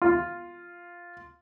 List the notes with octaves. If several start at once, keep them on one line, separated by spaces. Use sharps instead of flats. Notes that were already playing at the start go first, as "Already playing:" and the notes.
F4